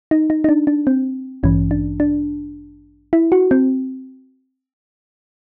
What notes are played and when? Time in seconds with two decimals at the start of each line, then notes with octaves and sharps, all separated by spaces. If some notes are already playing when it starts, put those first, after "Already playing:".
0.11 D#4
0.30 D#4
0.44 D#4
0.49 D4
0.67 D4
0.87 C4
1.43 A1 G2 E3 C#4
1.71 D4
2.00 D4
3.13 E4
3.32 F#4
3.51 C4